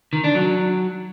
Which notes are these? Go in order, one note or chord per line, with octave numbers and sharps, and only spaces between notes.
D#3
D4
F#3